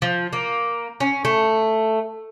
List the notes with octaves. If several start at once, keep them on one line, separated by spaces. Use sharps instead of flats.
F3
A#3
C#4
A3